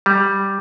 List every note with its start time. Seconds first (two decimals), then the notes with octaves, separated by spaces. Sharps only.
0.06 G3